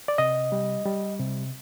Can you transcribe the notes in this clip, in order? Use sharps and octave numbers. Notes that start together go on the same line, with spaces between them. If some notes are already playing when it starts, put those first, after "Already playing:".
D5
C3 D#5
G3
G3
C3